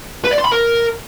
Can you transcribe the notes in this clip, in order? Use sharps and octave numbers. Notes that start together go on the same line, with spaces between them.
B4
D5
C6
B5
A#4